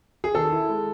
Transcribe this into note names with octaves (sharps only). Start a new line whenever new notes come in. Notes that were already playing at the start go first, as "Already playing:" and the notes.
G#4
D#3 A4
E4
G#3